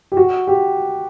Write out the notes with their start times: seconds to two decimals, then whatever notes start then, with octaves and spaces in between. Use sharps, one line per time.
0.12 G4
0.17 F#4
0.47 G4